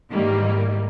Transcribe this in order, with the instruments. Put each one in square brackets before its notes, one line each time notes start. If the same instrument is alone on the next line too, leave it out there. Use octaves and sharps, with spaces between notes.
[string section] G#2 D#3 E3 G3 A#3